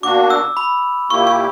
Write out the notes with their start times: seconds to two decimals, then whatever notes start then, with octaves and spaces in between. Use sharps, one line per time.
0.03 B2 A#3 D4 F#4 D6
0.30 E6
0.57 B5
1.10 A#2 A#3 E4 G4 C#6
1.27 C#6